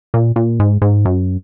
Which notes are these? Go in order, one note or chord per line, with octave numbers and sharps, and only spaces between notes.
A#2
A#2
G#2
G#2
F#2